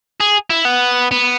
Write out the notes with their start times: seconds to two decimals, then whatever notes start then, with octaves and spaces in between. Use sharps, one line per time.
0.20 G#4
0.50 E4
0.65 B3
1.11 B3